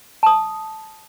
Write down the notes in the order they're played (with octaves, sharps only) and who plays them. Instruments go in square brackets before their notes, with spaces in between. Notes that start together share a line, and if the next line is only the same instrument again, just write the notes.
[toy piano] A5 D#6